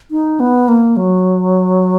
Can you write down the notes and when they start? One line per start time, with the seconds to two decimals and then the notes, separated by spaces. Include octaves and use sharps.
0.11 D#4
0.40 B3
0.68 A#3
0.97 F#3